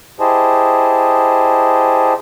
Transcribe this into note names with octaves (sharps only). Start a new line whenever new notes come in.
E4 G4 G#4 C5 D#5 A5